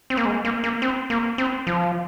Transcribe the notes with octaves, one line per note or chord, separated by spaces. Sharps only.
C4
A#3
G#3
A#3
A#3
C4
A#3
C4
F3